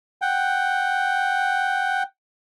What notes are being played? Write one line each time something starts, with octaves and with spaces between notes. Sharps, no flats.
F#5 G5